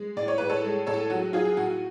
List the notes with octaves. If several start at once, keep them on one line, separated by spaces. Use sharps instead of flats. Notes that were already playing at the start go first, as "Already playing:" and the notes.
Already playing: G#3
A2 D5
C#5
A2 B4
A4 C#5
G#3
A2 A4 C#5
F#3 F#4
F#3 F4 G#4
G#4
A2 F#4